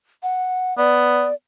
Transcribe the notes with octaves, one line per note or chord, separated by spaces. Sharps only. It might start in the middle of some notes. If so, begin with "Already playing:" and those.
F#5
B3 D5